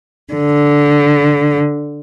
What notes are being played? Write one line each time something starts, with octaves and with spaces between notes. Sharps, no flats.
D3